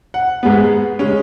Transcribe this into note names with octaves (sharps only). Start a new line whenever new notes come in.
F#5
G#2 G#3 B3
C#3 G#3 C#4